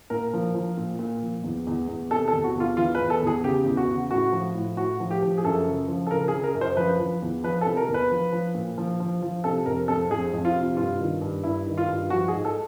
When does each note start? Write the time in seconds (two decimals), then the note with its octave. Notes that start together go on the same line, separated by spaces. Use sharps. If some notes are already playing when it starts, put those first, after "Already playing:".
0.10 A#2 A#4
0.33 F3
0.55 F3
0.77 A#2
0.99 A#2
1.22 F3
1.44 E2
1.67 E2
1.88 E2
2.11 C3 A4
2.28 A4
2.34 E2
2.44 F#4
2.56 E2 F4
2.77 E3 F4
2.95 B4
3.00 E2
3.10 A4
3.22 E2 G#4
3.43 C#3 G4
3.66 E2
3.77 F#4
3.88 C#3
4.11 A2 F#4
4.32 F3
4.55 A2
4.77 A2 F#4
5.00 F3
5.11 G4
5.22 F3
5.38 G#4
5.44 F#2 A4
5.66 C#3
5.88 F3
6.07 A4
6.11 C#3 A#4
6.28 G#4
6.33 C#3
6.44 A#4
6.55 F#2
6.61 C5
6.77 F3 B4
7.00 F3
7.22 E2
7.44 F3 B4
7.61 A4
7.66 C3
7.77 A#4
7.88 E2
7.94 B4
8.11 F3
8.32 F3
8.55 A#2
8.78 F3
9.00 F3
9.22 F3
9.44 C3 A4
9.66 F2 A#4
9.88 F2 A4
10.10 F2 G#4
10.33 F2
10.45 F4
10.55 C3
10.77 G2 F4
11.00 D#3
11.21 G2
11.44 G2 E4
11.66 D#3
11.78 F4
11.88 G2
12.10 F3 F#4
12.28 G#4
12.32 G#2
12.45 A4